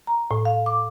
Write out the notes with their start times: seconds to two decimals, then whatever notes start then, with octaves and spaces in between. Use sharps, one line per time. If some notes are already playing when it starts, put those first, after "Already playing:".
0.07 A#5
0.31 A2
0.45 F5
0.66 D6